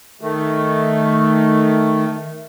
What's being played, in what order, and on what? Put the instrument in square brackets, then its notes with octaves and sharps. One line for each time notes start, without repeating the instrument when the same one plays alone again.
[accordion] D#3 A3